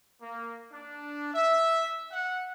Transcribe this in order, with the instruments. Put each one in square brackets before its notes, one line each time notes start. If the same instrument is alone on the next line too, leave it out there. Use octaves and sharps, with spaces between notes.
[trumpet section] A#3
D4
E5
F#5